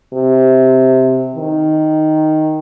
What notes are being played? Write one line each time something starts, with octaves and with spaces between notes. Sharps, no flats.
C3
D#3